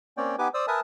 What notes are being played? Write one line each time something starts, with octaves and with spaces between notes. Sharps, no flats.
A#3 C4 C#4 C#5 D5 G5
B3 D#4 G4 B4 G#5 D6
C5 D5 D#6 E6
A#4 B4 E5 G#5 A5 D#6